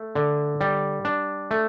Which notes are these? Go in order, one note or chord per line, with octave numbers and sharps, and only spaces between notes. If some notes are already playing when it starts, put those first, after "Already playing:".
Already playing: A3
D3
G3
D4
A3